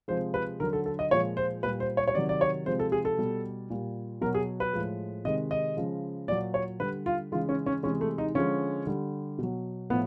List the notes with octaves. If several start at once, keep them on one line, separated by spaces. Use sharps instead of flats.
C3 F3 G#3 C5
B4
D3 F#3 A#4
A4
A4
D#5
A#2 F3 G#3 C#5
C5
A#2 G3 B4
C5
C#5
C#5
C3 D#3 F#3 D5
D5
C#5
C3 F3 G#3 C5
A4
G#4
A4
B2 G3
A#2 G3
B2 F#3 A#4
G#4
B4
A2 F3 G#3
C3 D#3 G#3 D#5
D#5
C#3 F3 G#3
A#2 F#3 D5
C#5
D3 G3 B4
F4
C#3 E3 G#3 F4
C#4
C#4
C3 E3 G#3 C#4
A3
D#4
D3 F3 G#3 C#4
D3 G3
B2 F#3
A2 F3 B3